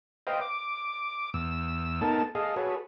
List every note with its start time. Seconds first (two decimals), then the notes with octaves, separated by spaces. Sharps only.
0.27 B4 C5 D#5 F5 G5
0.41 D6
1.34 E2 E6
2.01 B3 D#4 A4 A#4 A5
2.35 G#4 A4 D#5 F5
2.56 F#4 G#4 A4 B4 C#5